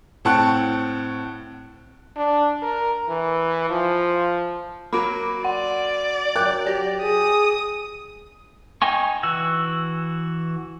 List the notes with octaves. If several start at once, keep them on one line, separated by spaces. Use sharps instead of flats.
A2 C4 F#5 A5 C#6 F#6
D4
A#4
E3
F3
F#3 A#3 B5 D6 D7
D5 F#5
F#3 A#4 G5 D6 F#6
G4 A#6
G#4 D#6
D#4 G5 G#5 C#6
E3 F#4 E6